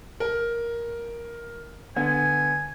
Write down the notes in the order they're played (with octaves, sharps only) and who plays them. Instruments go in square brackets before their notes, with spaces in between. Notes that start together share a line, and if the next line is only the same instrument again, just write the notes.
[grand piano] A#4
[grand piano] D3 B3 [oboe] G#5